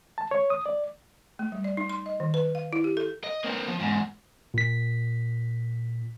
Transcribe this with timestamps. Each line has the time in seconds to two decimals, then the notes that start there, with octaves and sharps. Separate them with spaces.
0.18 A5
0.31 C#5
0.50 D#6
0.66 D5
1.39 A3
1.52 G3
1.64 D5
1.77 D#4
1.89 C6
2.06 D#5
2.20 D#3
2.34 B4
2.55 F5
2.73 E4
2.84 G4
2.97 A4
3.24 D#5
3.44 A#3 C4
3.68 F3
3.80 E2 G#2
4.54 A#2 B6